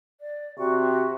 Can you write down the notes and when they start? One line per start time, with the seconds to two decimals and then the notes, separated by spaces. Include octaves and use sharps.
0.20 D5
0.58 C3 F#4 C#6